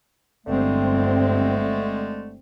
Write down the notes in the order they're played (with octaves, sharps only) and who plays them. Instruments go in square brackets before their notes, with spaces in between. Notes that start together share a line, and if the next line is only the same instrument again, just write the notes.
[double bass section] G1 C4 [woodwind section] D3 G#3 A3